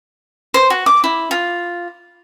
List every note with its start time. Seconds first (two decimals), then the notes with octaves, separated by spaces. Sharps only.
0.54 C5
0.70 F#4
0.86 D6
1.04 E4
1.31 F4